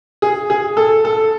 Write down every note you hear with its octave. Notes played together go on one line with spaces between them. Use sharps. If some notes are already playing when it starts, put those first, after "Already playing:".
G#4
G#4
A4
A4